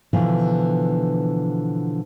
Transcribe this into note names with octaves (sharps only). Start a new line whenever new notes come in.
B2 D3 E3 F3